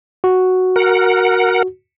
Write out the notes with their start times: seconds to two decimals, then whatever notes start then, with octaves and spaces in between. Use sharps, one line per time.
0.24 F#4
0.76 A#4 F#5